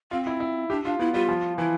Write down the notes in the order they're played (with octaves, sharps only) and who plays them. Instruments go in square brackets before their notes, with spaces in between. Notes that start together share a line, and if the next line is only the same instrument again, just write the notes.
[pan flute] C4 [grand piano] F4
[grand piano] E4
E4
[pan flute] D4 [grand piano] G4
[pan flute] D4 [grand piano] F4
[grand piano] B3 [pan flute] E4
[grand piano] G3 [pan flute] F4
[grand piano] F3
[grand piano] E3 [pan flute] E4